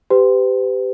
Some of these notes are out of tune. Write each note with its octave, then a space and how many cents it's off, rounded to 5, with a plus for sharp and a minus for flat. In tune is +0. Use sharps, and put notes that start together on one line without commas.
G4 +0 B4 +40